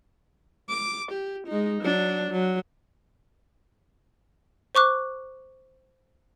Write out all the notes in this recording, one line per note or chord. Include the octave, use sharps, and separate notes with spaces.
D6
G4
G#3 D#4
F#3 D4
F#3
C5 C#6 D6 F#6